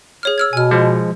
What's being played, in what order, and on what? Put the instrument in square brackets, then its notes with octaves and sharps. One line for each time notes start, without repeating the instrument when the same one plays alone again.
[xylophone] G#4 C#5 F6
E6 F6 G#6
[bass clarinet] B2 [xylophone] G#5 F6
[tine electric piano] F3 G#3